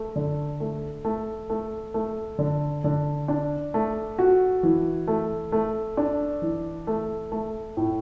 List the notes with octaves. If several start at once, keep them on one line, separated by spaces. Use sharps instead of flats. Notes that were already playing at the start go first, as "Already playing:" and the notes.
Already playing: A3
D3
A3
A3
A3
A3
D3
D3
D4
A3
F#4
E3
A3
A3
D4
E3
A3
A3
A2